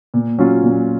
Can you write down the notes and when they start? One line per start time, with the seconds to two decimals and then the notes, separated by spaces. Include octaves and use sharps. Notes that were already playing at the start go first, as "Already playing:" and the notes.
0.14 A#2
0.38 F#3 C#4 F4
0.63 A#2